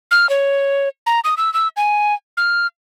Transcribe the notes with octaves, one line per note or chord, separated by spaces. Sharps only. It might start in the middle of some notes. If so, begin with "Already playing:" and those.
F6
C#5
A#5
D#6
E6
E6
G#5
F6